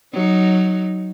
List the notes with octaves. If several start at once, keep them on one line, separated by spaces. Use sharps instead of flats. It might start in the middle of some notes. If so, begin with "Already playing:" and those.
F#3 D#4